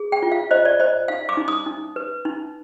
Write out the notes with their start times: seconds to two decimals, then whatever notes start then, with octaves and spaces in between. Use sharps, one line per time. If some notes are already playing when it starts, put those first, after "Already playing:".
Already playing: G#4
0.12 G5
0.23 F4
0.32 F5
0.51 C5 D#5
0.65 D5
0.80 C5 D#5
1.08 D#4 F5
1.29 D6
1.37 D#4
1.48 D#6
1.66 D#4
1.96 B4
2.25 D#4